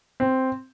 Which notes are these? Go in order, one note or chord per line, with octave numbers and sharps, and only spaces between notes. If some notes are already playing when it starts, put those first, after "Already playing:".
C4